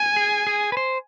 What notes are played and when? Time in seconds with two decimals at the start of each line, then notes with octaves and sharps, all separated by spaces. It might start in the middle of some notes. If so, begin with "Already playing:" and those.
Already playing: G#5
0.16 G#4
0.47 G#4
0.72 B4
0.77 C5